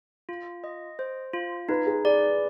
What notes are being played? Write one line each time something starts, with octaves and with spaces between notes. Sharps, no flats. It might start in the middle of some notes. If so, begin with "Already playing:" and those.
F4
D#5
C5
F4
D#4 B4
G#4
G#4 D5